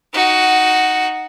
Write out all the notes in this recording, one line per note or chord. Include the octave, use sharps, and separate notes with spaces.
D#4 F#4